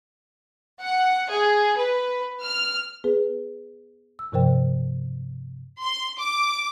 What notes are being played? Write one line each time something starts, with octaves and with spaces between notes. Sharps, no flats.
F#5
G#4
B4
F6
B3 G#4 B4
E6
G2 C3 F3 A#4 C5 G5
C6
D6